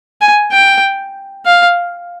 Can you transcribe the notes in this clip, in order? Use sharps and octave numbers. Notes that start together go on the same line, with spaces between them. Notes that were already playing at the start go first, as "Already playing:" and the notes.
G#5
G5
F5